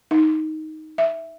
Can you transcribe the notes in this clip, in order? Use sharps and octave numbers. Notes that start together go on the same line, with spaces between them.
D#4
E5